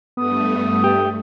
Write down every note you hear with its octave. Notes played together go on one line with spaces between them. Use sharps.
G2 A3 B3 D#6
G4